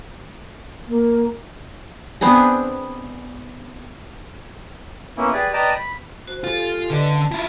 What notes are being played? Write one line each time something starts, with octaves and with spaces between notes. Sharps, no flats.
A#3
B3 C4 D4 G#4
A#3 B3 C#4 E4
G4 G#4 B4 D5
B4 D5 D#5 G5 A5 A#5
B5
F#4 C5
F4 G4 A4 G#5
D3 B4 D5 D#5
C#4 F5 A5
E4 F4